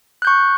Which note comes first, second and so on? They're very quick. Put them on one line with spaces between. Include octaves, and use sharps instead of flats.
F#6 G6 C#6